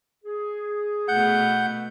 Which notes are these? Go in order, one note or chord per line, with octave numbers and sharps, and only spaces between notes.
G#4
B2 A3 F#5 G6